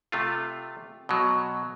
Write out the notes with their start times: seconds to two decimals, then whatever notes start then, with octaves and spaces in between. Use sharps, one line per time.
0.12 C3 A3 F4
1.09 B2 F#3